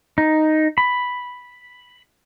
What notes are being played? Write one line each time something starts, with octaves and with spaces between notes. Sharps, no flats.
D#4
B5